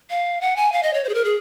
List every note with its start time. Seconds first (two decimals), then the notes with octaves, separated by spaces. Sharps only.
0.10 F5
0.41 F#5
0.56 G#5
0.72 F5
0.83 D#5
0.94 C#5
1.04 C5
1.09 G#4
1.14 A#4
1.25 G#4